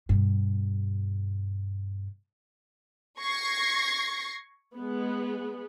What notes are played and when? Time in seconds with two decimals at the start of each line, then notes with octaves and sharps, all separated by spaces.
0.09 G2 B2
3.20 C#6 G#6 A#6 C7
4.76 G#3 B3